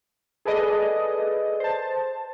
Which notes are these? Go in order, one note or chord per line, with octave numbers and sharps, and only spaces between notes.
G#4 A4 B4 D5 D#5
C5 A5